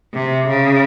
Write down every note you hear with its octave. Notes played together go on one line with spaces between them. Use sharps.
C3
C#3